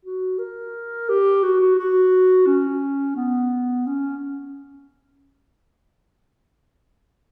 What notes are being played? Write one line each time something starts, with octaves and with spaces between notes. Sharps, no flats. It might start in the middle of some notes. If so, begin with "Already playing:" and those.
F#4
A#4
G4
F#4
F#4
F#4
C#4
B3
C#4